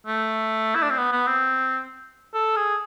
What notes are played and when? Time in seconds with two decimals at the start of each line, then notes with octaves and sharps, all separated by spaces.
0.07 A3
0.76 E4
0.83 D4
0.90 C4
0.98 B3
1.12 B3
1.27 C4
2.34 A4
2.56 G#4